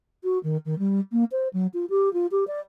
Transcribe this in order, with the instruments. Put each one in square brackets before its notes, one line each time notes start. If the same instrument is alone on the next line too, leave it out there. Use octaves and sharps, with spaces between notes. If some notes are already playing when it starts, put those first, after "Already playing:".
[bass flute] F#4
D#3
D#3
G3
A#3
C5
F#3
F4
G4
F4
G4
D5